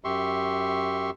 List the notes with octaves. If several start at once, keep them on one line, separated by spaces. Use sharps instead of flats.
F#2 G4 E5 C6 C#6